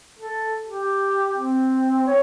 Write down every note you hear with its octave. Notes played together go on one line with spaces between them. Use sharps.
A4
G4
C4
C#5